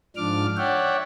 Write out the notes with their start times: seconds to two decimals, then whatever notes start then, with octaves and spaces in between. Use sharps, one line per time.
0.16 G#2 F3 D4 D6 F6
0.57 C#5 D5 E5 F#5 G5